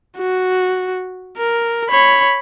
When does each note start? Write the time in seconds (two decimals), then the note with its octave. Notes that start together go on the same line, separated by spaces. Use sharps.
0.18 F#4
1.38 A#4
1.90 C#5 B5